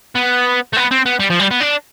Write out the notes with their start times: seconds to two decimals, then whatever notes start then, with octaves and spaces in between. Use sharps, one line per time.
0.15 B3
0.73 A3
0.77 B3
0.91 C4
1.06 B3
1.20 G3
1.30 F3
1.40 G3
1.51 B3
1.61 D4